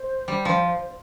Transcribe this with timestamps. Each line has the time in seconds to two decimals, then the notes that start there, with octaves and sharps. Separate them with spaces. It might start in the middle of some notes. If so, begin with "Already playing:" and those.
Already playing: C5
0.28 G3
0.45 F3